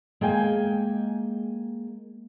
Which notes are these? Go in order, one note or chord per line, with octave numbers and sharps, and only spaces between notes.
G#3 A#3 G5 G#5